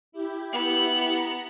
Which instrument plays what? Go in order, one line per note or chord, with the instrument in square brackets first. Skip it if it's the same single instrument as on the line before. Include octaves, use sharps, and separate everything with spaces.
[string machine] E4 G4
[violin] B3
[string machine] A#5